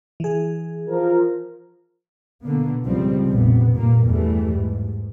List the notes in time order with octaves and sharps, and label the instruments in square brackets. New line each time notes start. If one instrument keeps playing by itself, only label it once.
[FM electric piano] E3 G#4
[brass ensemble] F3 A#4
[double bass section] B2 D3 A#3 B3
C#2 G#2 C#3 F3 G3 C4
F1 A#1 C3 B3
G2 A#2 A#3
E2 G2 E3 G3 A3
G#2